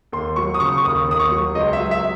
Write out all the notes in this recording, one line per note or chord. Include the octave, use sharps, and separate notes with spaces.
D#2 C6
F#3 C#6
D#6
C#3 C#6
C#6
D#2 D#6
D#2 D#6
C#6
F#3
C#2 D#5
E5
F#3
E5